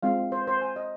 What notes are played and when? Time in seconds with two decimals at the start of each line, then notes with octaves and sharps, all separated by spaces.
0.03 G#3 C4 F4 F5
0.32 C5
0.47 C5
0.62 G#5
0.76 D#5